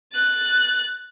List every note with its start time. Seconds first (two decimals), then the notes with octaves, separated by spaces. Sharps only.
0.13 F#6 A6